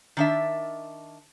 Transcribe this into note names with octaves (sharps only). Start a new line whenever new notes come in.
D#3 D4 E5